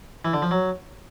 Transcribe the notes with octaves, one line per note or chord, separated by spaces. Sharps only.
E3
D3
F3
F#3